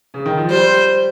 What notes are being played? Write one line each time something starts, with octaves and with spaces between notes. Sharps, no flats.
C#3
D#3
F3
G3 C5